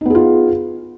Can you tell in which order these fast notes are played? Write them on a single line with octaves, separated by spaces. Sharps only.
D#4 B3 G#4 F4